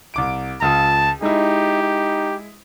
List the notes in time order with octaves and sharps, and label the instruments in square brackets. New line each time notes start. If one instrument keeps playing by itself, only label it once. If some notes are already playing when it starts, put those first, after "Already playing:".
[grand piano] C2 D6 D7
[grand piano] C#2 F4 D#6 [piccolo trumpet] A5
[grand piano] G#3 E4 [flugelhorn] D#4 [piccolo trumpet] G4
[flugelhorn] D#4